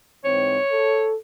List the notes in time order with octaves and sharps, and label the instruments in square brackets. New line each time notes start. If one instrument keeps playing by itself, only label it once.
[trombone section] G#2 E3 C4 [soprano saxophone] C#5
[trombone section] A4